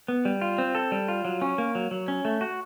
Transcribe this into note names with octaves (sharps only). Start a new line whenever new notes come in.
B3
G3
F4
C4
A4
G3
F4
F#3
C#4
A#3
F#3
F#3
C#4
A3
F#4